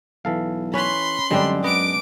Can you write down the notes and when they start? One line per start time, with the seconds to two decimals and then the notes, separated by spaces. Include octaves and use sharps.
0.25 B1 E3 A4 F5
0.74 C#4 B4 B5 C6
1.31 F#2 D3 G3 G#3 C4 D4
1.64 B3 D#5 D6 D7